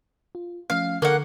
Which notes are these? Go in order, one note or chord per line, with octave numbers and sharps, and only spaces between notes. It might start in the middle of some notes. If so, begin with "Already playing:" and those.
F4
F3 A3 C#4 F5
D3 A#3 A4 F#5 C#6